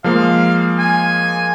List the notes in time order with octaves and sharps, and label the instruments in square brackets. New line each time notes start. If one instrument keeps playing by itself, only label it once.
[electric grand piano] F3 G#3 A#3 [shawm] F5
[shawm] G#5